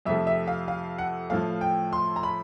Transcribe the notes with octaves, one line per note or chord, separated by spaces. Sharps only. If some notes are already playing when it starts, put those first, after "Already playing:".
F2 C3 F3 A3 E5
E5
F5
F5
F#5
A2 F3 A3 F5
G5
C6
A#5
B5